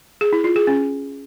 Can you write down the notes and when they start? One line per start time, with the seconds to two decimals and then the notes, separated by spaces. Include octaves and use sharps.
0.21 G#4
0.33 E4
0.44 F4
0.56 G#4
0.67 C#4